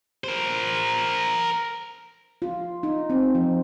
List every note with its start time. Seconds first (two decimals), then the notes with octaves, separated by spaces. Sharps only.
0.24 A#4 C5
2.42 F4
2.83 D#4
3.10 C4
3.35 F3